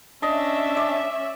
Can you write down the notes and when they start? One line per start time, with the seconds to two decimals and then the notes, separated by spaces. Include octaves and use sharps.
0.23 C#4 D4 D#5 E5
0.77 D5